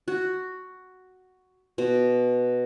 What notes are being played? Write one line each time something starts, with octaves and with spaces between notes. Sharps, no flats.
F#4
B2